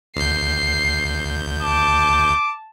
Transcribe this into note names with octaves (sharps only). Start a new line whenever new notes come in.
D2 G6 C7
A5 D6